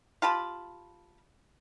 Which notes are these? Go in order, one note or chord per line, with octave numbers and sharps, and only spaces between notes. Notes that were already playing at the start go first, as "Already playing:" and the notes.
F4 G4 A5 B5